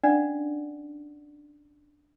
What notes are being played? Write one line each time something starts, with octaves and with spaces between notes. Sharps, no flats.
C#4 D4 D5 F#5